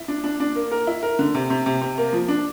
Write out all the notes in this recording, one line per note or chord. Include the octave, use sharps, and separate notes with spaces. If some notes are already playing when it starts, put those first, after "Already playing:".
Already playing: E4
D4
D4
D4
A#3
A#4
E4
A#4
D3
C3
C3
C3
C3
A#3
F3
D4